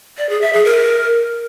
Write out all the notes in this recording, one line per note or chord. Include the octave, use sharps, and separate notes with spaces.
D5
G#4
E5
G#4
A#4